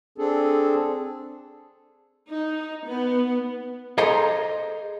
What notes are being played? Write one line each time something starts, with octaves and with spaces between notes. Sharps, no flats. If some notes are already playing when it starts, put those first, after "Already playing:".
C4 D4 G#4 A4
D#4
B3
G#4 A4 C5 D#5 A#5 C6